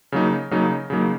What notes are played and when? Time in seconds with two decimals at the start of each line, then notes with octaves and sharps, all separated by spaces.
0.12 C#3 F#3 A#3 D#4
0.51 C#3 F#3 A#3 D#4
0.90 C#3 F#3 A#3 D#4